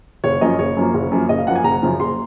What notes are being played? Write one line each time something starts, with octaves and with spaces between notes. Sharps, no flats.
F#1 C#5
F#2 F3 A#3 D#5
F#1 C#5
F#2 F3 A#3
F#1
F#2 F3 A#3
F#1 D#5
F5
F#2 F3 A#3 F#5
G#5
F#1 A#5
F#2 C#3 F3
F#1 C6